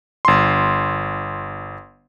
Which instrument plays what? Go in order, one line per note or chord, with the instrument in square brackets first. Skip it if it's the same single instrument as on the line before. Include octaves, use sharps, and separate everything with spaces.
[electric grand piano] G1 C6